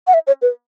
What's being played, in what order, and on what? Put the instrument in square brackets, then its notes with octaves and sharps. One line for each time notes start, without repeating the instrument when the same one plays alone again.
[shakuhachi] F#5
E5
C#5
B4